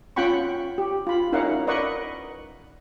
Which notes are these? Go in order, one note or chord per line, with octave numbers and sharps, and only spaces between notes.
C#4 F4 F#5 G5 B5 C#6
G4
F4 B5
C#4 D#4 E4 A#4 F5 F#5
A#4 B4 D5 D#5 F#5 C#6